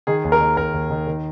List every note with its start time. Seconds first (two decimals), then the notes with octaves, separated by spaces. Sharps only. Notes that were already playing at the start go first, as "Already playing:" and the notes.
0.07 D#3 G#4
0.24 D#2
0.32 A#4
0.40 D#3
0.57 D#2 A#4
0.73 D#2
0.90 D#3
1.07 D#3